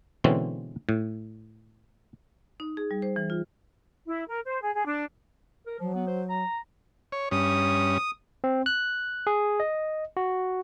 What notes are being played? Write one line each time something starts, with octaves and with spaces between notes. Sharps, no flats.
B2 D3 E3 G#3 C4 C#4
A2
D#4
G#4
G3
C5
E3
F4
E4
A#4
C5
G#4
G#4
D4
A#4
F3 F#3
B3
C5
A#5
C#5
G2 C#4 D#6
C4
F#6
G#4
D#5
F#4